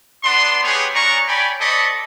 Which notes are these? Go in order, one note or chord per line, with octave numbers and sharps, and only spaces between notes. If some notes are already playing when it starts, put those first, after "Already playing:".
B3 D4 C6
G3 B3 G4 G#4 B4 C#5
G#3 C#4 F#4 D5 A#5 C#6
C#5 D5 G5 G#5 B5
C4 A4 D5 D#5 B5 C#6